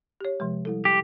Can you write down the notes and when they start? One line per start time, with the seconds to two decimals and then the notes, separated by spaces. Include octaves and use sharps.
0.21 G4 C#5
0.40 C3 F3 G#3
0.65 G3 E4 A4
0.85 G4